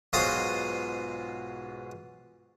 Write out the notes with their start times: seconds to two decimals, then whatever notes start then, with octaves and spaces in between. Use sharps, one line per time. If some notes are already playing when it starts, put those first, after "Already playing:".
0.13 B1 G#2 F#3 F4 C5 D#6